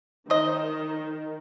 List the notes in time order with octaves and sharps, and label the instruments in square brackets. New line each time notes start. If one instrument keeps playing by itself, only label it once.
[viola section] D#3 [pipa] C5 D#5